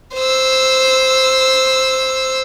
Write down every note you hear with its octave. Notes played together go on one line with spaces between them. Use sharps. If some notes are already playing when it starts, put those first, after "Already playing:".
C5 E6